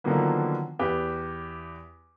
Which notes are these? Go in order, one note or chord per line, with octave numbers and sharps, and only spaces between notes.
D3 D#3 F3 F#3 A#3 B3
E2 G4 B4